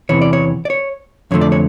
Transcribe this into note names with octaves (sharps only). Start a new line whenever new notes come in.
E2 C3 E3 C#5
D5
C#5
D5
C#5
F2 D3 F3 A3 C#5
D5
C#5